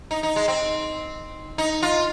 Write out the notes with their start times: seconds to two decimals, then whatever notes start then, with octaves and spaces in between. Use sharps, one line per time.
0.11 D#4
0.23 D#4
0.36 G#3
0.48 C4
1.58 D#4
1.82 F4